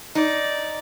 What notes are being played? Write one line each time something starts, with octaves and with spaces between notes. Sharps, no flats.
D#4 D5